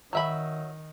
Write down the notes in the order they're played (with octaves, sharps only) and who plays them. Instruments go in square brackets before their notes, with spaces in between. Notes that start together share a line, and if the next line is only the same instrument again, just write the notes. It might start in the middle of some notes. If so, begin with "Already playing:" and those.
[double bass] D#3 [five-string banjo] F#3 E5 B5